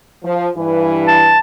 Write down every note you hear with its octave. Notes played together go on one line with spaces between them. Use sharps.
F3
G2 E3 B4
A5